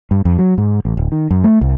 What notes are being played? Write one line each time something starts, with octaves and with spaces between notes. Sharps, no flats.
G2
F2
F#3
G#2
A1
D1
D#3
F#2
A3
C2